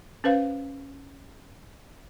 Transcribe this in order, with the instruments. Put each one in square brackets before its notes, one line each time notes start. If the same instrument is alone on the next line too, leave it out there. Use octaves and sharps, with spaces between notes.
[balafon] C#4 B4 C5 F5